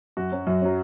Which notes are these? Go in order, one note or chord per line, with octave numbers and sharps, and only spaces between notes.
F#2 F#4
F#3 C#4
F#2
F#3 C#4